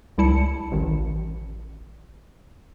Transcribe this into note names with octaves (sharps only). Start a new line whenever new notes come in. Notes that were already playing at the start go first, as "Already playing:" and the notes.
C#2 G3 E4 A5 C#7
A1 D#3